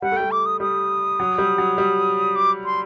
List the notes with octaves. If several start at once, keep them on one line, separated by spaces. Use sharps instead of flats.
G3 F#5
A3
G3 G5
D6
D#6
G3 D#6
F#3
G3
F#3
G3
D6
C6